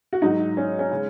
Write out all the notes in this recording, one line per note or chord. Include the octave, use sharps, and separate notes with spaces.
F#4
G#2 F#3 D#4
C#4
C#4
C#3 G#3